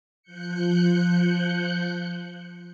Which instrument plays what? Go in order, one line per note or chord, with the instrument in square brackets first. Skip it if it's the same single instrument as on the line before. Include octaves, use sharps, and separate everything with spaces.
[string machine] F3 F#6 G6 C#7